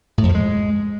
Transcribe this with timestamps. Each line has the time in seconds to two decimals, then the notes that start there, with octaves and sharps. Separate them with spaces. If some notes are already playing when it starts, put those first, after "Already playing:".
0.18 A2
0.23 F2
0.29 F3
0.35 G#3